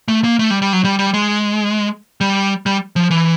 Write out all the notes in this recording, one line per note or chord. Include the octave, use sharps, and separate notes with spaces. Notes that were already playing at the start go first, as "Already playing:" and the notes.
A3
A#3
A3
G3
G3
F#3
G3
G3
G#3
G3
G3
F3
E3